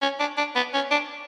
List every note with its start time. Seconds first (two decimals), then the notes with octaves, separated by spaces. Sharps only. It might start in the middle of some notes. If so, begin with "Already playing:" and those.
0.02 C#4
0.20 D4
0.37 D4
0.55 B3
0.74 C#4
0.91 D4